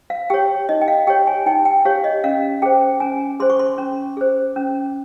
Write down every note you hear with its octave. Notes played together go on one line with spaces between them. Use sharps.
F5
G4 C#5 G5
D#4 D#5
G5
F5
G4 C#5 G5
G#5
D#4 G5
G5
G4 C#5 F5
D#5
C#4 F5
G#4 C5 G5
C#4 G#5
G#4 C5 C6
C#6
C6
C#4
G#4 C5
C#4